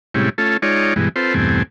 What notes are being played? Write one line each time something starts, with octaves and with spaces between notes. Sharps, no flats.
A2 C3 G3 G#3 C#4 E4
A3 C#4 F4 A4
G#3 D#4 F4 C#5 D5
G2 B2 E3 G#3
C4 F4 A4 B4 C5
E2 G2 B2 A3 C4 G#5